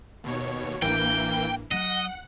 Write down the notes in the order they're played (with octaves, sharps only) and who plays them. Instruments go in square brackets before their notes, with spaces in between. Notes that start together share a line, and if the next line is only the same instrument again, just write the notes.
[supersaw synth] D#2 B2 C#5
[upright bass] A1 D4 [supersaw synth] E3 A#3 [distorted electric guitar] G5
[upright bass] F#3 [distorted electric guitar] D#5 [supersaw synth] F#5